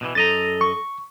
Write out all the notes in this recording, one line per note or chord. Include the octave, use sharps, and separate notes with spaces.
B2 D3 E3
F#2 A4 D#5 A#5 A6
C#6